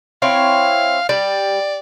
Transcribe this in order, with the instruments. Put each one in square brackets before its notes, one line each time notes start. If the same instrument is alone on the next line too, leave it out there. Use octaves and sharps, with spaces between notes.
[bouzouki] C4 E4 C#5 [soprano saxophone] F5
[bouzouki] G3 [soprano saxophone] D5